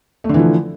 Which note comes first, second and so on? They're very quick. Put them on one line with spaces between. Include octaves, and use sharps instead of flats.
A3 D3 E3 F3